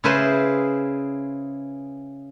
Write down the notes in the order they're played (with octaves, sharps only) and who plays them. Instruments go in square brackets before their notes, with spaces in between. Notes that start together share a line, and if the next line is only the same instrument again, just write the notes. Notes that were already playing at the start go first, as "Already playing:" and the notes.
[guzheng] C#3 E4 G#4 B4 C5 C6